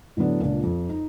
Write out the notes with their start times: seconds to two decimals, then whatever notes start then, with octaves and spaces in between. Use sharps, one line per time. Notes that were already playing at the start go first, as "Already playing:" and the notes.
0.17 A2 D3 F#3 B3 D4
0.41 C#2 A#2 D4
0.63 F2
0.89 D#4